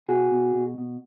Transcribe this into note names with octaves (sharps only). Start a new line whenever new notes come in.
B2 F#4 G#4
B2
B2
B2